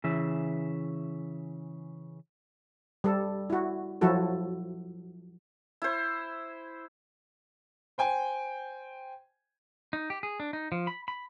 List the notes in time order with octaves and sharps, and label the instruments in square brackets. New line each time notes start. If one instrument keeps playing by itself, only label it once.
[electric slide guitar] C#3 E3 E5
[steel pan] G3 A4
E4 F#4
F3 F#3 E4 F#4 A4
[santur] E4 C5
[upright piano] C5 G5 G#5
[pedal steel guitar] D#4
G4
G#4
D4
D#4
F3
B5
B5